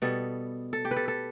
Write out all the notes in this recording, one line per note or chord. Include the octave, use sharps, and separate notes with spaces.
B2 G3 B3 A4
A4
G4
B4
A4
A4